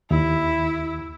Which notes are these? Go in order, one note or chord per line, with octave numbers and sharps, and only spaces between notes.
D#2 E4